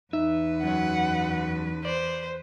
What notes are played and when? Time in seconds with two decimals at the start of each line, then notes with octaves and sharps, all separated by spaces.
0.13 E2 D#4 B4 E5
0.63 F#2 F#3 F#5
1.85 C5 D5